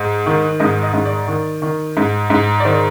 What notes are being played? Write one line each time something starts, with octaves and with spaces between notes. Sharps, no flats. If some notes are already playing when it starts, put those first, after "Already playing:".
Already playing: G#2
D#3
G#2 D#5
D#5
G#2
D5
D#3
D#3
G#2
G#2
D5
D#3 C5